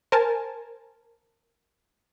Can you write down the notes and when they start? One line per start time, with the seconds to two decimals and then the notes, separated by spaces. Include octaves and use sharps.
0.12 A#4 C5 G#5 A5